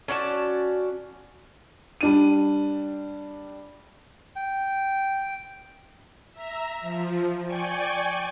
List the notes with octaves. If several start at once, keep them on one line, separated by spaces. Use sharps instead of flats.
C#4 F#4 D5 A5
G3 D4 D#7
G5
E5 A#5
F3
D5 G5 G#5 C#6